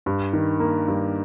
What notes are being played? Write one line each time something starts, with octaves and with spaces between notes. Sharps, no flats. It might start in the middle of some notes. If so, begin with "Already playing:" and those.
G2
D#3
A#3
G2